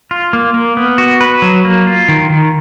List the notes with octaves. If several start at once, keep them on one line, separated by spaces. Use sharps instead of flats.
F4
A#3
A#3
B3
F#4
B4
F#3
A#3
F4
D#3
D#3